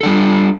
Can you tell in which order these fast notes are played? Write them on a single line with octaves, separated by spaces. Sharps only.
A4 D4 G3 F4